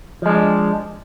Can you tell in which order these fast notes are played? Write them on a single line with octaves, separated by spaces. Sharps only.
F3 G#3 D4